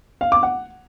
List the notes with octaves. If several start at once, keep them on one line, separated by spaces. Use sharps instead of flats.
F5
D6
F#5